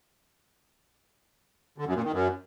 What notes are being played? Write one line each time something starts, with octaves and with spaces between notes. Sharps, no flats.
D3
F#2
A#2
D#3
F#2